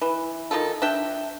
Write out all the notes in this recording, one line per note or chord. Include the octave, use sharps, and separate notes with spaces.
E3
D#3 G3 F4 A4
D4 E5 G5